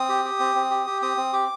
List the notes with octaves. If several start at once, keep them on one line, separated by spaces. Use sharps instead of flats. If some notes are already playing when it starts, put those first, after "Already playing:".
Already playing: C4 D#6
G4
G4
C4
C4
G4
G4
C4 D#6
C4
G4 D6